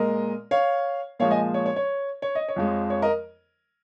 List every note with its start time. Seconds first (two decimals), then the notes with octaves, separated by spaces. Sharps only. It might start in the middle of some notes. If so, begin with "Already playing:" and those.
Already playing: A#2 G#3 A#4 D#5
0.51 C#5 F5
1.19 A#2 F3 G#3 C#5 F5
1.31 D#5 G#5
1.54 C#5
1.66 C#5
1.76 C#5
2.22 C#5
2.35 D#5
2.48 C#5
2.56 F2 F3 G#3
2.90 C#5
3.02 A#4 D#5